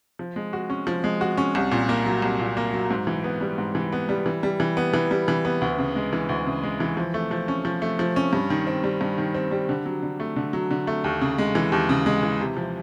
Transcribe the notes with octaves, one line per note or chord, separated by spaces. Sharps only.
F3
G#3
F#4
C#4
F3
G#3
F#4
C#4
C2
A#2
A#3
F#3
C2
A#2
A#3
F#3
G#2
E3
B3
G3
G#2
E3
B3
G3
E3
G3
E3
B3
E3
G3
E3
B3
D2
C#3
G#3
E3
D2
C#3
G#3
E3
F3
A3
F3
C#4
F3
A3
F3
C#4
G2
D#3
C4
G3
G2
D#3
C4
G3
D3
F#3
D3
A3
D3
F#3
D3
A3
D#2
C#3
G#3
E3
D#2
C#3
G#3
E3
C3
F3